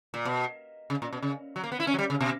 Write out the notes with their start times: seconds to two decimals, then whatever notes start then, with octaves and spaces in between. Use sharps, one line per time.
0.14 A#2
0.25 B2
0.90 C#3
1.02 A#2
1.13 B2
1.22 C#3
1.56 F#3
1.64 A#3
1.72 B3
1.80 E4
1.87 C#4
1.94 F#3
1.99 G3
2.10 C#3
2.21 B2